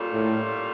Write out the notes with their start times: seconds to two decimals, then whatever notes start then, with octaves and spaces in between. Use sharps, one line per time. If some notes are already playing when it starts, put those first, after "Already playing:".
Already playing: A#2 G3 C#4 F4 A4
0.13 A2